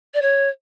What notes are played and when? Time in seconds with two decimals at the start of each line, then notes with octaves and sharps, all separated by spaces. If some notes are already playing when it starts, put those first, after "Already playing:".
0.14 D5
0.21 C#5